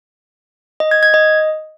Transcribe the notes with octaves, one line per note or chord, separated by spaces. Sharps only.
D#5
G#6
G#6
D#5